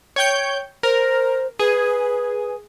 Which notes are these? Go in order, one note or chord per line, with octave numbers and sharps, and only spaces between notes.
C#5 G5 G6
A#4 C5
G#4 B4